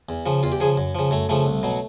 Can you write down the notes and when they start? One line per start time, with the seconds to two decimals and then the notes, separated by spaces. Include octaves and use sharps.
0.09 E2
0.26 C#3 F3
0.43 E2 F4
0.52 G4
0.60 C#3 F3 G#4
0.78 F#2
0.95 C#3 F3
1.11 F#2 A3
1.29 C#3 F3 A3
1.46 C2
1.63 B2 F#3